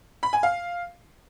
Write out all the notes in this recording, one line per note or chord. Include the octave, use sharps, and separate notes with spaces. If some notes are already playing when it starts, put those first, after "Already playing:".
B5
G#5
F5